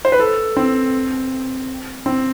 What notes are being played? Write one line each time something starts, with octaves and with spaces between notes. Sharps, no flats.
C5
B4
A4
C4
C4